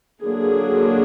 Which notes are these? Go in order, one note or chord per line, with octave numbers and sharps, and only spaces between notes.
D3 F#3 A#3 D4 G#4